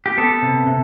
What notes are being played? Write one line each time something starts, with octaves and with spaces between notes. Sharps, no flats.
G4
B3 A4
C3
C3